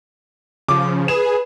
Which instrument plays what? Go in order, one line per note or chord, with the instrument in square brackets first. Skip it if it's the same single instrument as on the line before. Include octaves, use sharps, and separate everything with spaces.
[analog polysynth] C#3 F3 [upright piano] D6
[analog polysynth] G#4 [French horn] B4 [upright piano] E7